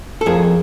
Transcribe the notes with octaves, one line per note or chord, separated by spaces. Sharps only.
A4
F2 G#4 A#4